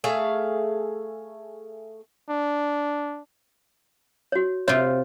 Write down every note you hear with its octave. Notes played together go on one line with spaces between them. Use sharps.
A3 G#4 E5 F5
D4
F#4 C#5
C3 F4 C#5